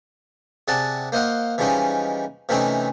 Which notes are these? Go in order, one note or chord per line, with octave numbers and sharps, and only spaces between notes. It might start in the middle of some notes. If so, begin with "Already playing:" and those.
C3 G#4 D5 F#5 A5
A#3 C5 D#5 F5 F#5
E3 F3 G3 G#3 C#4 D#4
C3 E3 A3 C4 C#4 D#4